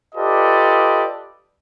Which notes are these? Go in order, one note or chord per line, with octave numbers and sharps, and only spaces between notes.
F4 G4 A4 B4 D5 D#5